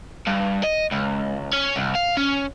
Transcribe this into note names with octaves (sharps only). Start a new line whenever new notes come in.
G2
D#5
C#2
C#4
C2
F5
C#4